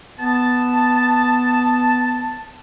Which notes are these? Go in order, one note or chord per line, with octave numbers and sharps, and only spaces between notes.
B3 A5